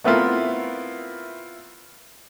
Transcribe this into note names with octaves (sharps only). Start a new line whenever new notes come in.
A3 B3 C4 E4 F4 A#4